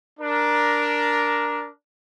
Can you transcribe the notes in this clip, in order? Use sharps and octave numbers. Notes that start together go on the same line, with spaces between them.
D4 A#4